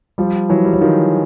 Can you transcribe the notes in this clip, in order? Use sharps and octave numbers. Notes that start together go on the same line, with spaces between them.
F3 G3
E3 F#3
G3
F#3
D#3 F3